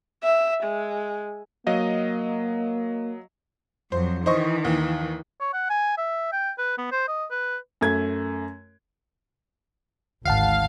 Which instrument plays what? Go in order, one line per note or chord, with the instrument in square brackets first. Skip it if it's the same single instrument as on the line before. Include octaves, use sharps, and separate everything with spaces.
[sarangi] E5
G#3
[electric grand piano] F#3 D#5 F5 [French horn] A#3
[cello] F2 F#3 [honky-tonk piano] C5
[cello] D#3 E3 [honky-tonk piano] C5 D#5 C#6
[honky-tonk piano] D#2
[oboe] C#5
F#5
G#5
E5
G5
B4
B3
C5
D#5
B4
[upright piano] F#2 A3 G#6
[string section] G#1 [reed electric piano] D2 F#5 A5 [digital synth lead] F5